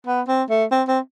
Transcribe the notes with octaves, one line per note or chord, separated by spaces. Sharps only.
B3
C4
A3
C4
C4